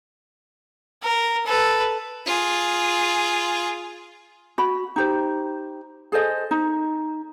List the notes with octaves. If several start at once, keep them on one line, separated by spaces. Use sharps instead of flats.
A#4
A4 B4
F4 G#4
F#4 B5
D#4 G4 C5
G#4 A4 C5 D#5
D#4